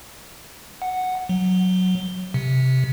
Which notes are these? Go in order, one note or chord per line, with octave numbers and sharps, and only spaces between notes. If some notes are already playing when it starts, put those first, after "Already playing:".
F#5
F#3
C3